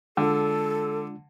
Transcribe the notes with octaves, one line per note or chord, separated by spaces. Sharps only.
D3 G#3 D4 F4 A4